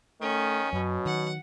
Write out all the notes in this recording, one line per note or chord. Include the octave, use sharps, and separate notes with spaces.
D#3 A3 C#4
F#2 B2 F#3
D#3 F#5